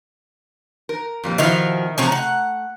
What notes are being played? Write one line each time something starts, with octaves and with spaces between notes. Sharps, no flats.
A#4
F2 A#2 G3
B2 D#3 F3 E4 E5 F5
C3 F3 A3 C#4 A#5
F#5